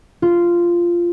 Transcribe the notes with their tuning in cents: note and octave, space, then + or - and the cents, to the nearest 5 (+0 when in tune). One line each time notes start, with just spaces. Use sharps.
F4 -10